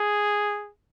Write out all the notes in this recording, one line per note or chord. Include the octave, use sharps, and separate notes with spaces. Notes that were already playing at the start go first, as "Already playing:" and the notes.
Already playing: G#4